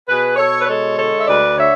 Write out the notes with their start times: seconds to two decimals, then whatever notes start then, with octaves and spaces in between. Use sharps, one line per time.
0.07 B2 G#4 B4
0.37 B2 A4 C#5
0.60 B4
0.66 G#3 A4 C#5
0.97 D3 A4 C#5
1.18 E5
1.26 D2 B4 D5
1.56 D3 C#5 E5